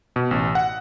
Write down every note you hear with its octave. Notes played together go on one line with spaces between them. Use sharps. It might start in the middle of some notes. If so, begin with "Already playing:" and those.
B2
A1
F#5